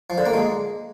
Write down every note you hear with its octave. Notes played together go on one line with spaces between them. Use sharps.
F3
D3
A#3
G#3